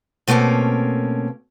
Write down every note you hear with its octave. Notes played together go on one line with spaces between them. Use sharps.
B2 A3 A#3 C4 C#4